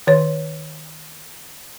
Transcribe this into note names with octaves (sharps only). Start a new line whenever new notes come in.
D#3 C#5